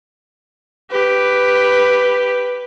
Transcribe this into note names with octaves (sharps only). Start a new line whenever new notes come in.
G4 B4